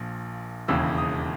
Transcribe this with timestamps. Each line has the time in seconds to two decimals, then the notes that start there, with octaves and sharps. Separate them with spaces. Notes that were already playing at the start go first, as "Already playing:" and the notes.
Already playing: A#1 A#2 F3
0.68 E1 D#2 C#3 E3 E6
0.98 D#6